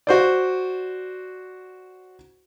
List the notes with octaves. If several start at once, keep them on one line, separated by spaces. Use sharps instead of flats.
F#4 C5 D5